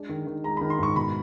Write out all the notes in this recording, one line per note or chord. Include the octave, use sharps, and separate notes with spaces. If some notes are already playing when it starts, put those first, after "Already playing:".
Already playing: G#3 D4
D#3
D#3
G#3 A#5
D#3 B5
C6
G#2 C#6
B2 B5